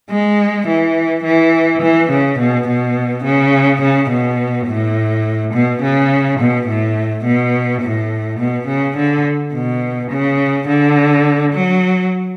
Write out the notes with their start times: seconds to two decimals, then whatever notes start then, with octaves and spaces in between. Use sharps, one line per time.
0.10 G#3
0.67 E3
1.24 E3
1.82 E3
2.10 C#3
2.39 B2
2.68 B2
3.24 C#3
3.81 C#3
4.10 B2
4.67 A2
5.53 B2
5.82 C#3
6.39 B2
6.67 A2
7.24 B2
7.82 A2
8.39 B2
8.67 C#3
8.97 D3
9.53 B2
10.11 C#3
10.68 D3
11.53 F#3